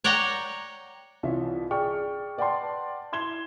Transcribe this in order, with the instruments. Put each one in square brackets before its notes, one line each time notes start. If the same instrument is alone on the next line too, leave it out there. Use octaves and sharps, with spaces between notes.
[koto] C#5 D5 F#5 G5 A#5
[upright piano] C2 E3 C#4 F4 E5
G#4 D5 G5 C#6 F6
B4 D5 F#5 G5 A5 C6
E4 C6 G#6 E7 G7